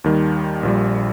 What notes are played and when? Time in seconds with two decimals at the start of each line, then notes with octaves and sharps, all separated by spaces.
0.04 D#2 D#3 G3
0.63 A#1 A#2 G3